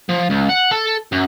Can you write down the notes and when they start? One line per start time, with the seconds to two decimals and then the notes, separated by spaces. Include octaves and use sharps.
0.09 F3
0.30 C#2
0.50 F#5
0.71 A4
1.12 F#2